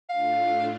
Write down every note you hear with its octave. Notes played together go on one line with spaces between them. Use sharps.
A2 A3 D4 F4 F5